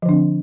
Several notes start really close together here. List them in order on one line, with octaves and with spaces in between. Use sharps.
F3 D3 D4 C4